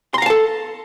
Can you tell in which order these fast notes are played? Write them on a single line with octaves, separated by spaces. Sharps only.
C6 A#5 F5 A5 A4